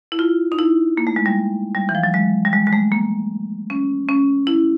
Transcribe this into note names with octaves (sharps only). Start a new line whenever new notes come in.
E4
F4
D#4
E4
A#3
A3
G#3
G3
G3
E3
F3
F#3
G#3
G3
G#3
G#3
A3
A#3
C#4
C#4
E4